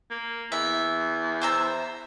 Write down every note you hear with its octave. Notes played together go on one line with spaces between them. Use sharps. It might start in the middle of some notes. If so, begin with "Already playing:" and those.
A#3
E2 E5
C5 E5 A#5